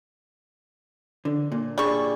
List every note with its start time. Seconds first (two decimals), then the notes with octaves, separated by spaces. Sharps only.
1.25 D3
1.52 A#2
1.78 G3 D4 G#4 D5 C#6